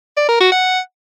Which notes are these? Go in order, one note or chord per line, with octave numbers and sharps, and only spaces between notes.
D5
A#4
F#4
F#5